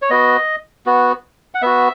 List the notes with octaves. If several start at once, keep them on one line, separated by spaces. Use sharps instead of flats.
C#5
B3 F#4 D#5
B3 F#4
F#5
B3 F#4 E5